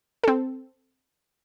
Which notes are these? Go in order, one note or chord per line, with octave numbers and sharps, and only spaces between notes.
C4 A4